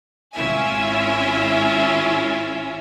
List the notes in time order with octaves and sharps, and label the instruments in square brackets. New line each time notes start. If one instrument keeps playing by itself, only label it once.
[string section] G#1 C#4 E4 F4 E5 G#5